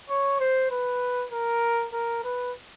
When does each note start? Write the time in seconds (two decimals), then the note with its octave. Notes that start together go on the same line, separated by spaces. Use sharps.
0.10 C#5
0.40 C5
0.71 B4
1.32 A#4
1.93 A#4
2.24 B4